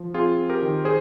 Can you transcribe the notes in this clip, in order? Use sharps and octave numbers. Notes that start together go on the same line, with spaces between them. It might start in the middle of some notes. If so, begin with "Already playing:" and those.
Already playing: F3
C4 F4 G#4
C4
G4 A#4
D#3
G#4 C5